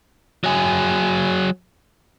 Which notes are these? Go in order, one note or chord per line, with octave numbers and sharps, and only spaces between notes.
F#3 G#4